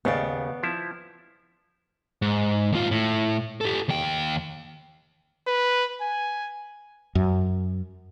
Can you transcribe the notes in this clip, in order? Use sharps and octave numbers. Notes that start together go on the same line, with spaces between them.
D#2 C#3 B3 D5
F3 E4
G#2
D#2 F4
A2
G4 A4
D#2 G5
B4
G#5
F#2